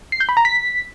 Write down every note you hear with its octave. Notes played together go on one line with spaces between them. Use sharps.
C7
G6
B5
A#5
B6